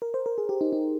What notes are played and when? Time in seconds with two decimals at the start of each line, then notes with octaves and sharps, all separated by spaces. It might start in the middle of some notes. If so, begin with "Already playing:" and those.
0.02 A#4
0.14 C5
0.26 A#4
0.38 G#4
0.49 G4
0.61 D#4
0.73 D#4